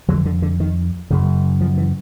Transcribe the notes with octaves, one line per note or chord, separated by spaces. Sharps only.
F2 D3 F#3
D3
D3
D#3
F#2 C#3
F3
E3